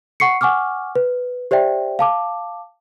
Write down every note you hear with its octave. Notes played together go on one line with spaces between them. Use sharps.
F#5 C#6 C7 C#7
F#5 G#5 C#6 D6 F6
B4
G4 C5 D5 E5 G5
F5 A5 D6